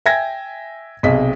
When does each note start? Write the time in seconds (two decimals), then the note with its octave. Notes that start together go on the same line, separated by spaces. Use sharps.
0.06 E5 G5 G#5 G#6 A#6
1.03 B1 C3 G#4 D#5 B6